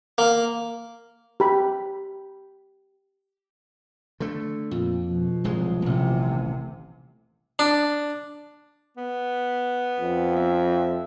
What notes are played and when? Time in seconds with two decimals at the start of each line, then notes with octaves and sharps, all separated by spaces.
0.18 A#3
1.40 G4 B5
4.20 D3 A3
4.71 F2 A#2
5.10 B2 F3
5.44 D1 C2 G#3
5.82 D#1 A1 C3
7.59 D4
8.97 B3
10.00 F2
10.36 E5